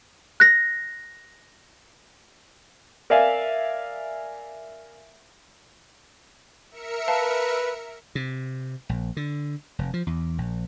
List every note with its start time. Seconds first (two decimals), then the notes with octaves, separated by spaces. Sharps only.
0.40 F#6 A#6
3.10 A#4 D5 E5 F5 G#5
6.70 A#4 E5 C#7
7.08 B4 F5 A5 E7
8.15 C3
8.89 A#1
9.17 D3
9.79 F1
9.94 F3
10.07 E2
10.38 A#1